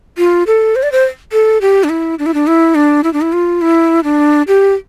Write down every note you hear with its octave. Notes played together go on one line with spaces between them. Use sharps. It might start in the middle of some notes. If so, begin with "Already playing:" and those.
F4
A4
C5
D5
C5
A4
G4
D4
E4
D4
E4
D4
E4
D4
E4
D4
E4
F4
E4
D4
G4